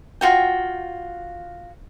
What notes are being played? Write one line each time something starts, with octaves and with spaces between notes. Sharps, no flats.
F4 F#4 G5